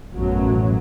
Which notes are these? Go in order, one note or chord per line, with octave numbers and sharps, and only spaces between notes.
A1 F#2 B2 F#3